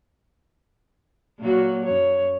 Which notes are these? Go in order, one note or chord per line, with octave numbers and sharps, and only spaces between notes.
A#2 F#3 F#4
F#2 C#5